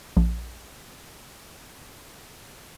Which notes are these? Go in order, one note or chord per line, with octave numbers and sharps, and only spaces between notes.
A#1 F3